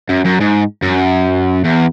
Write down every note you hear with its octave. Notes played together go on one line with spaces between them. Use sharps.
F#2
F#2
G#2
F#2
E2